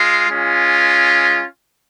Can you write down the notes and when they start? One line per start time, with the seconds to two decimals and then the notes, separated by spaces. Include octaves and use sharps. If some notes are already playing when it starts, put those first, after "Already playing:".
Already playing: G#3 F4
0.29 G#3 C#4 F4